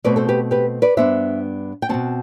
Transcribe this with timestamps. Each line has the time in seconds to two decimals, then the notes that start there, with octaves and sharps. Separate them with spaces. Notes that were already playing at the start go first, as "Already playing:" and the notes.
0.04 B2 A3 C4 B4 D5
0.16 A4 C5
0.29 G4 B4
0.51 G4 B4
0.82 B4 D5
0.97 G2 E3 B3 D4 C5 E5
1.82 G5
1.89 F#3 C4 F#5 A5
1.94 B2